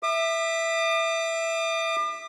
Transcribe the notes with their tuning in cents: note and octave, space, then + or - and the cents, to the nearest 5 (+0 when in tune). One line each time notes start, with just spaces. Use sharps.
E5 +0 D6 +45